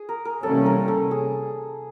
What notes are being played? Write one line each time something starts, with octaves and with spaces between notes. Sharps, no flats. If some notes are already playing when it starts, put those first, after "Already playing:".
Already playing: G#4
A#4
A#4
C3 E3 G3 A#3 C#4 A4
A#4
A4
G#4